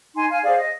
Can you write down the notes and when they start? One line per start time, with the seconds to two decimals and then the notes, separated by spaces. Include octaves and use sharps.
0.15 D#4 G#5 C6
0.29 F5 G#5
0.43 G#4 C5 D5 F5
0.58 D#5